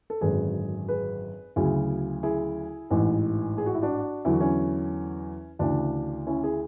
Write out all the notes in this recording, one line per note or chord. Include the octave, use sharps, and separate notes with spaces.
A4
G#1 F#2 D3 G#4 B4
G#4 B4
D2 C#3 F#3 E4 G#4
E4 G#4
A1 G#2 E3
G#4
F#4
E4
D4 F#4
E2 D3 F#3 E4
F#4
C#4 E4
D2 C#3 E3 D4
C#4 E4
E4 G#4